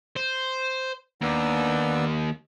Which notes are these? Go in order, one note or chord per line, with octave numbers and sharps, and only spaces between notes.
C5
D#2 B3 D4 E6